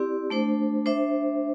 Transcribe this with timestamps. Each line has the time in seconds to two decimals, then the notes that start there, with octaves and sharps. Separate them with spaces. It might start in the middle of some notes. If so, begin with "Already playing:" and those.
Already playing: C4 E4 G4 D5
0.30 A3 D4 C5
0.86 D4 C5 E5